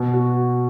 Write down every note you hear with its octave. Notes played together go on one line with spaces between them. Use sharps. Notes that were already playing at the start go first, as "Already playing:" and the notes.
Already playing: B2
F#4